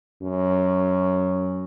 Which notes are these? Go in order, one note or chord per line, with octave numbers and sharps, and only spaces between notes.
F#2